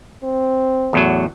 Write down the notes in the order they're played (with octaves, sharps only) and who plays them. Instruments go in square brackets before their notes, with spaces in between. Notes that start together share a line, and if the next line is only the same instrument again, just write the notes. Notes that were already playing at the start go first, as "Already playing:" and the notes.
[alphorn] C4
[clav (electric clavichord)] E2 A2 F#3